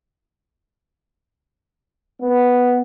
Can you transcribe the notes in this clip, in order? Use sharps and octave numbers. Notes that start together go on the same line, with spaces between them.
B3